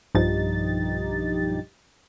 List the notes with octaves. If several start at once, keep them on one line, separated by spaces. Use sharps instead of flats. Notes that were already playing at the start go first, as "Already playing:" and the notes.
B1 G2 F3 D#4 G4 A6